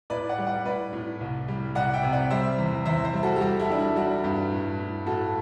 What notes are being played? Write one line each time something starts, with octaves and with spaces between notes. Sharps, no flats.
A2 B4 D5
D5 F#5
G3
D5 F#5
A2 B4 D5
A2
C2
G3
C2 D5 F#5
E5 G5
C3
D5 F#5
G3 C5 E5
E2
E2 C5 E5
C5 E5
G3
F#4 A4
G4
G3 F#4 A4
E4 G4
G3 D4
E4
G3 D4 F#4
G2
A2
A2
A2 F#4 A4